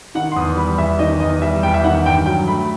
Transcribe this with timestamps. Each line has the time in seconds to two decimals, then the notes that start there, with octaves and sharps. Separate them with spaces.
0.15 D#3 F#5
0.32 C6
0.36 E2 D#6
0.57 G3 B5
0.78 E2 E5
0.99 D#3 D#5
1.20 E2 D#5
1.42 G3 E5
1.63 E2 G5
1.74 E5
1.84 D#3 F#5
2.05 G2 G5
2.26 F#3 G5
2.48 A3 B5